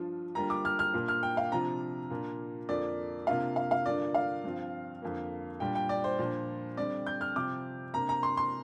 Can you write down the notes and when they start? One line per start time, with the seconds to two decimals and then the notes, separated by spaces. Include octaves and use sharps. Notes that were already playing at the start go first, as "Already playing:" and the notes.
Already playing: G2 F3 D4 F4
0.35 D3 G3 A#3 F4 A#5
0.50 D6
0.65 F6
0.79 F6
0.94 A#2 A#3 D4
1.08 F6
1.23 G5
1.37 F5
1.52 C3 F3 D4 F4 A#5
2.10 A#2 A#3 D4 F4
2.69 F2 D3 A#3 F4 D5
3.27 C3 A#3 D4 F4 F5
3.56 F5
3.71 F5
3.85 G2 D3 A#3 F4 D5
4.14 F5
4.44 G2 F3 C4 F4
5.02 F2 D3 A#3
5.60 A#2 G3 D4 G5
5.75 G5
5.89 D5
6.04 C5
6.19 A#2 F3 D4
6.77 D3 G3 C4 D5
7.07 G6
7.21 F6
7.36 C3 F3 C4 D6
7.94 C3 A#3 D4 A#5
8.09 A#5
8.23 C6
8.37 C6